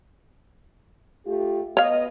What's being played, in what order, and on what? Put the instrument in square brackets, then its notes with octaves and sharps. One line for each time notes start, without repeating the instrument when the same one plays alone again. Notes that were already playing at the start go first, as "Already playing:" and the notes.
[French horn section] A3 F4 G4
[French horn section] B3 D#5 [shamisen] C#5 F5